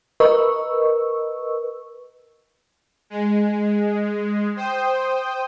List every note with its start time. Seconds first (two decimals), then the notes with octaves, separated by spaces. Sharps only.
0.20 A#4 B4 D#5 C#6 E6
3.10 G#3
4.56 C5 G5 D#6